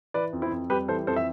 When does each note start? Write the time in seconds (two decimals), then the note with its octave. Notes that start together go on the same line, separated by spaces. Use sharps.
0.14 E3 B4 D5
0.33 F2
0.42 C4 E4
0.52 F2
0.70 G3 G4 B4
0.88 E3 A4 C5
1.07 F2 A4 C5
1.16 E5